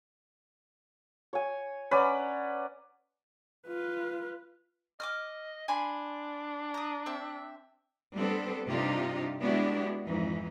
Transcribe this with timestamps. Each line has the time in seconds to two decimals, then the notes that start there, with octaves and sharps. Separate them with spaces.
1.33 C#5 G#5
1.91 C#4 B4 D5 F#5 A#5
3.68 F4 B4
5.00 D#5 D6 D#6 F6
5.68 D4 G#5 B5 C6
6.74 A#5 D#6
7.06 C4 E5
8.16 G3 B3 C4 D4 A4
8.69 G2 C3 D4 D#4 F4 G4
9.41 G#3 B3 D4 E4 F#4 G4
10.06 F2 G#2 E3 D#4